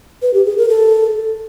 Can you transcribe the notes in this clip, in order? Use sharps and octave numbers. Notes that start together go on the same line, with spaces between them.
B4
G4
G#4
A#4
A4